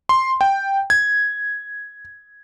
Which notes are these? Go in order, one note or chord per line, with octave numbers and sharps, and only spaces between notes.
C6
G5
G#6